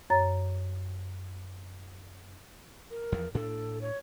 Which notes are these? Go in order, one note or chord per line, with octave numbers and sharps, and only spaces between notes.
F#2 C#5 A#5 A6
A#4
E2 F3
A2 D4 A4
C#5